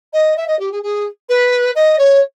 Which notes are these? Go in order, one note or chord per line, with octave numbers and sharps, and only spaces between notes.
D#5
E5
D#5
G4
G#4
G#4
B4
D#5
C#5